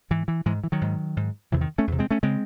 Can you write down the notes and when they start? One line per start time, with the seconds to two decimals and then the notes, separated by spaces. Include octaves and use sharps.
0.10 G#2 E3
0.28 E3
0.46 G#2 E3 G#3
0.64 E3
0.72 D#3 F#3
0.81 G#2
1.17 G#2
1.52 E2 C3 E3
1.61 D#3
1.78 A3 C#4
1.87 E2 C3
1.99 G#3 C4
2.11 A3 C#4
2.23 C#3 G#3 C4